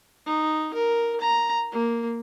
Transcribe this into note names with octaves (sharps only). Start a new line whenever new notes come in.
D#4
A#4
A#5
A#3